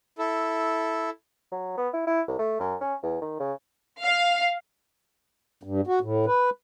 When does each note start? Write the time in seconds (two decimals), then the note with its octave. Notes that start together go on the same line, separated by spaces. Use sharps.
0.18 E4 A4
1.52 F#3
1.77 B3
1.93 E4
2.07 E4
2.27 C2
2.39 A3
2.60 F#2
2.81 C#4
3.03 E2
3.21 D#3
3.40 C#3
4.02 F5
5.63 G2
5.87 F#4
6.01 A2
6.26 B4